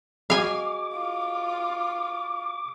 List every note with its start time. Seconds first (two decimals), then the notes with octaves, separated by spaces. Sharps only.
0.30 F#4 G#4 D#5 F5 G#5 D6
0.94 F4